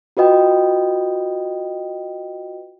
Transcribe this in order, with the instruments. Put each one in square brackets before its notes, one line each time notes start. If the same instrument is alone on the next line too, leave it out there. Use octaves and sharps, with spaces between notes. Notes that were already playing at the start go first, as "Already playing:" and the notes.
[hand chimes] F4 F#4 B4 D#5 G5